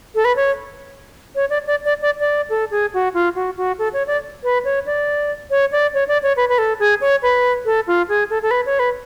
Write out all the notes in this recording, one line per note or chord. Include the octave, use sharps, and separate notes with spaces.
A4
B4
C#5
C#5
D5
D5
D5
D5
D5
A4
G#4
F#4
F4
F#4
F#4
A4
C#5
D5
B4
C#5
D5
C#5
D5
C#5
D5
C#5
B4
B4
A4
G#4
C#5
B4
A4
F4
G#4
A4
A4
B4
C#5
B4